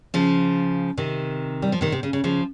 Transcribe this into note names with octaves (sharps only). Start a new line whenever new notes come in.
C#3 F3
C3 D#3
G3
F3
C3 D#3
C3
C#3
C#3
C#3 F3